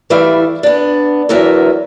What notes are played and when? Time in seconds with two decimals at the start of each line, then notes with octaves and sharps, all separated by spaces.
0.10 E3 G3 A3 E4 E5 F5
0.63 B3 D4
1.29 E2 D3 E3 F#3 A#4 E5